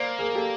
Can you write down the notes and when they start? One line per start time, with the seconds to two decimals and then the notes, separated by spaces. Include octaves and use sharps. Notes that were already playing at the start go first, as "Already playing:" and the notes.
Already playing: A#3 C5 D5
0.19 G#4 A#4
0.35 G4 A4